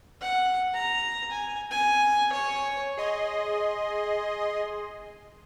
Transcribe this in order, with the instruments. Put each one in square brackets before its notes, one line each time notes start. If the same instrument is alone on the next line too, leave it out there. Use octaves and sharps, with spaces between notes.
[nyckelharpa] F#5
A#5
G#5
G#5
C#5
[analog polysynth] G#4 D#5 C6